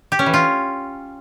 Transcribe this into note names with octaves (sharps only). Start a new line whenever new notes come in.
G4
C#4
E3
F4